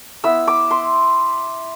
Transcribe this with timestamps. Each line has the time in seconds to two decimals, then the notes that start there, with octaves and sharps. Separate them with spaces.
0.24 B3 E4 E6
0.48 D6
0.71 C6